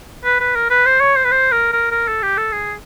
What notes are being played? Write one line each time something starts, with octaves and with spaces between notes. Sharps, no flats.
B4
B4
A#4
B4
C5
C#5
C5
B4
C5
A#4
A#4
A#4
A4
G4
A4
G#4